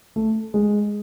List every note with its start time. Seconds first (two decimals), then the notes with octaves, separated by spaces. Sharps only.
0.16 A3
0.54 G#3